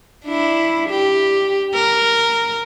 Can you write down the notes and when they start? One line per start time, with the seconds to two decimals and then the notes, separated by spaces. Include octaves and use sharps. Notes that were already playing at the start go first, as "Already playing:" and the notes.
0.25 D4 E4
0.90 G4
1.74 A#4